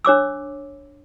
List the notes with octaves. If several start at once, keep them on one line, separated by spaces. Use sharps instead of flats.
D4 C#5 D6 E6